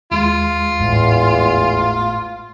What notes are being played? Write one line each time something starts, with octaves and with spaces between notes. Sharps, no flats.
D#2 G#3 F4
G#1 E2 A2